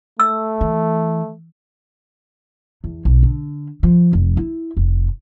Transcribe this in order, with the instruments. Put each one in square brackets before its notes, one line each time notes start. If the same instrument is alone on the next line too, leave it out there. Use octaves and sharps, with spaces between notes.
[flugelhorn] A3 [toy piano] E6
[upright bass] E3
E2
B1
D3
F3
F1
E4
F1